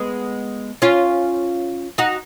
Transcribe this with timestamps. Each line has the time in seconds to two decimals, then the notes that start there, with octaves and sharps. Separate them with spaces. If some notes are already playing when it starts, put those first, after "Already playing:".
Already playing: G#3 B3
0.82 C#4 F4
1.98 D#4 F#4